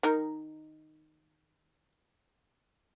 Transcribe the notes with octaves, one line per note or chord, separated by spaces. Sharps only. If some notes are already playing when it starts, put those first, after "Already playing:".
D#3 D#4 A#4